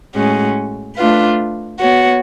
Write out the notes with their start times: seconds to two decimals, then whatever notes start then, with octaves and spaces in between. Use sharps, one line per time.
0.16 A2 G#3 C#4 F#4
0.97 A3 D4 F4 B4
1.80 B3 F#4 C#5